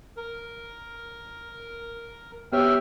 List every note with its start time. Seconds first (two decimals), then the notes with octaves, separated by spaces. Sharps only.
0.17 A#4
2.52 B3 G4 C#5 E5 G5 F6